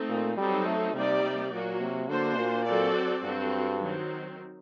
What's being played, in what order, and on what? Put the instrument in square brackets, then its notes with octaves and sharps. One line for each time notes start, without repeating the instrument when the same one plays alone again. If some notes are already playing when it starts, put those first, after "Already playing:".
Already playing: [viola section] A3 C4 D#4
[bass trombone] A#2
[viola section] F#3 C4 D#4 A4 [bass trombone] G3
[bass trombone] A3
[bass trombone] C3 [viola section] G3 A#3 D#4 G4 D5
[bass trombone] C3
[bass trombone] A#2 [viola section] F#3 A#3 F#4
[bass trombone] C3
[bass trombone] D3 [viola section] A#3 D4 F#4 C5
[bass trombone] A#2
[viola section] F#3 C4 F#4 A4 D5
[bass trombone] G2 [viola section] C4 F#4 A4
[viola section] D#3 F#3 C4